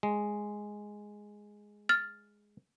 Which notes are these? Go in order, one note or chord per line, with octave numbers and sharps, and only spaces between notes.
G#3
F6 A6